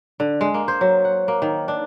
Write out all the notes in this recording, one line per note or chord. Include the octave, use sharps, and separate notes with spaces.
D3
G#3
A#3
C5
F#3
F#5
A#3
D#3
D4